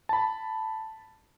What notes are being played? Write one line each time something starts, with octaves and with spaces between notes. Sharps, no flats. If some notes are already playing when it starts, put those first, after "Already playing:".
A5 B5